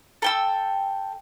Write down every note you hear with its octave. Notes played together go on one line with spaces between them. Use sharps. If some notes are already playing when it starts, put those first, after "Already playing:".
A4 G5 E6